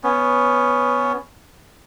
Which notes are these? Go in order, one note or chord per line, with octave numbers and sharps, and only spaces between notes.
B3 C#4